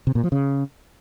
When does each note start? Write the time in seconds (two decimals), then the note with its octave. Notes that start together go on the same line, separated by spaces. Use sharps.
0.07 C3
0.15 A#2
0.24 F3
0.32 C#3